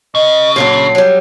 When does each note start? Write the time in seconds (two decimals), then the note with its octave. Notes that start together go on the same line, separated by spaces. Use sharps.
0.15 C#3 D#5
0.56 A#2 D3 F#3 C7
0.95 F#3 G3